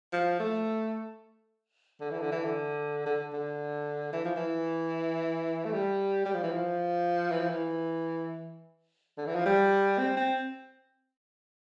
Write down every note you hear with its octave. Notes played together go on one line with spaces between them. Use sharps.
F3
A3
D3
E3
D3
E3
D3
D3
D3
E3
F3
E3
A3
G3
G3
F3
E3
F3
E3
F3
E3
D3
E3
F3
G3
C4
C4